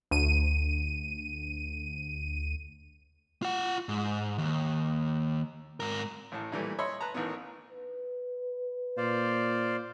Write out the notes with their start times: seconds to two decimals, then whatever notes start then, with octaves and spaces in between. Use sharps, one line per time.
0.11 D2 D#7
3.42 F4 F#5
3.89 G#2
4.38 D#2
5.80 G#2 A#4
6.32 A1 A2 A5
6.52 A#2 E3 G3 A3
6.79 C#5 D#5 E5 B5 C6
7.01 B4 A5 A#5
7.14 A1 A2 D#3 B3
7.70 B4
8.97 A#2 C5 D5 F5